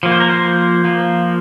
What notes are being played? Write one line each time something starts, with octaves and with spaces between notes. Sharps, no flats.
F3 A#3
C5
A#4
C5
F3 A#3